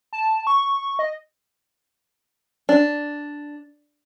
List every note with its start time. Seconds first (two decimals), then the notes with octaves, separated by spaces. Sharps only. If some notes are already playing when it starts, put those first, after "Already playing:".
0.13 A5
0.47 C#6
0.99 D#5
2.69 D4